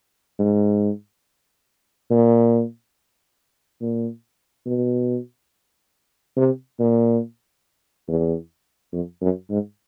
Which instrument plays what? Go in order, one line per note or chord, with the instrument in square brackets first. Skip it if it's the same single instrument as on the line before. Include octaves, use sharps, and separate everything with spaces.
[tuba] G#2
A#2
A#2
B2
C3
A#2
E2
F2
F#2
G#2